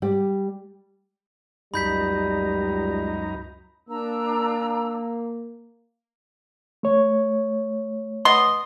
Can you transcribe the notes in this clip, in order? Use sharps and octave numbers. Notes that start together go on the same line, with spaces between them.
G3
C#2 F#2 G3 D#4 A#5 B5 G6 B6
A#3 D4 A#5 E6
A3 C#5
B3 D#5 C6